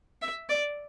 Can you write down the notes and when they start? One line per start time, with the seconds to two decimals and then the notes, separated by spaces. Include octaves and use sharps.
0.22 E5
0.49 D5